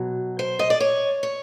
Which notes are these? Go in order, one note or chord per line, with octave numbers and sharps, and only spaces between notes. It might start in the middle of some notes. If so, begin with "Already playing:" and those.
Already playing: B2 F#3
C5
D#5
D5
C#5
C#5